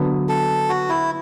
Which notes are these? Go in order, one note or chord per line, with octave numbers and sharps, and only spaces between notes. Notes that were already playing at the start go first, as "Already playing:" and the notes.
Already playing: D3 F#3 B3
A4
F#4
E4